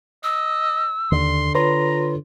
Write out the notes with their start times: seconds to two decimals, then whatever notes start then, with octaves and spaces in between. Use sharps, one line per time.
0.24 D#5 E6
1.12 D#2 D3 C6
1.55 F4 B4 C#5 A#5 C6